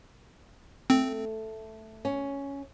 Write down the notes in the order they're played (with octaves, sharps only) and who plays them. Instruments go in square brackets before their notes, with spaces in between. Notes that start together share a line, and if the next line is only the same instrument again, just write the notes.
[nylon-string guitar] A3 [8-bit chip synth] C4
[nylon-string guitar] C#4